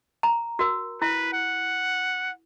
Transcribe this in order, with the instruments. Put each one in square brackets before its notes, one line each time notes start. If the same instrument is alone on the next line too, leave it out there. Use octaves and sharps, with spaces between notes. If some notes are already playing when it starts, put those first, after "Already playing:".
[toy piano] A#5
F#4 A#4
[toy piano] E4 [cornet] B4
[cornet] F#5